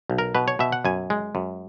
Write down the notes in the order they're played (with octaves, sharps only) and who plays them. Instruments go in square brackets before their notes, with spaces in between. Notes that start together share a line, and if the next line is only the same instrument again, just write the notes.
[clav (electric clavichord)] B1
A#4
B2 B4
C#5
B2 E5
F#5
F#2 G#5
G#3
F#2